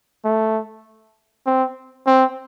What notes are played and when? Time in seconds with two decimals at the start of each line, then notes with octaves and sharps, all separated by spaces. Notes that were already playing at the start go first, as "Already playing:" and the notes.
0.25 A3
1.46 C4
2.07 C4